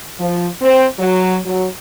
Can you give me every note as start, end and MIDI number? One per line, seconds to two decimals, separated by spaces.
0.19 0.46 53
0.61 0.86 60
0.98 1.37 54
1.46 1.66 54